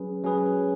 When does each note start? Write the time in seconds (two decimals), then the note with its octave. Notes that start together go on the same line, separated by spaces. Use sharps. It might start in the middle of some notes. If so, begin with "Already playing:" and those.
Already playing: F#3 C#4 G#4 B4
0.24 F#3 C#4 G#4 B4